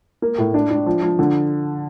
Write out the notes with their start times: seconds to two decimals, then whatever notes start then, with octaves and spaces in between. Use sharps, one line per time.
0.22 A#3
0.38 A2
0.54 D4
0.71 D4
0.86 F3
1.02 F3
1.19 D3